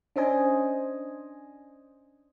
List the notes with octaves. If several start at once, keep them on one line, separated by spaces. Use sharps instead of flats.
C#4 D4 C5 D#5 G#5